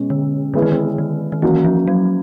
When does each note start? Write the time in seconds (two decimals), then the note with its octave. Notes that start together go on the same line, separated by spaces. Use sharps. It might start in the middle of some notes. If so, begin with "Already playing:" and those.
Already playing: B2 G#3 C#4
0.10 D3
0.54 D3 E3 G#3 B3 E4 G#4
0.62 D#3
0.72 D3
0.98 D#3
1.32 D#3
1.42 E3 F#3 A#3 C#4 F#4
1.65 F3
1.88 F#3